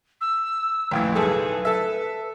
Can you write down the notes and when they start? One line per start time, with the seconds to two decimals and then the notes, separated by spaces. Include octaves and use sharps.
0.21 E6
0.91 A1 F2 E3 G5
1.15 B1 G#4 A4 B4
1.65 A4 E5